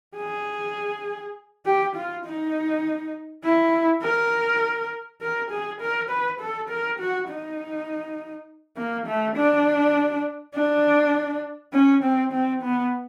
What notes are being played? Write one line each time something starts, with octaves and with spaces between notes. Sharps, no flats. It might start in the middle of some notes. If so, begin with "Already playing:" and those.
G#4
G4
F4
D#4
E4
A#4
A#4
G#4
A#4
B4
A4
A#4
F#4
D#4
A#3
A3
D4
D4
C#4
C4
C4
B3